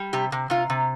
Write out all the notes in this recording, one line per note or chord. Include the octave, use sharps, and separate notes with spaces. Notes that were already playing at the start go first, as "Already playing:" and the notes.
Already playing: G3
C3 G4
C3
C3 F4
C3